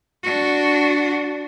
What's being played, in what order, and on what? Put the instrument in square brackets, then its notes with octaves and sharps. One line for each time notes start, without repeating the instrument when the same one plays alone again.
[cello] D4 F#4